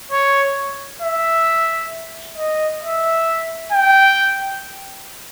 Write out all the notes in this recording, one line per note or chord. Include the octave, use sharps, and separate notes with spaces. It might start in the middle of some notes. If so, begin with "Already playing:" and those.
C#5
E5
D#5
E5
G5